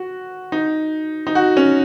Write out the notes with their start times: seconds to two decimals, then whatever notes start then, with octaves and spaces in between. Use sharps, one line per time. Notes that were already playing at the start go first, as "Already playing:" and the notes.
Already playing: F#4
0.52 D#4
1.27 D#4
1.35 F#4
1.57 C#4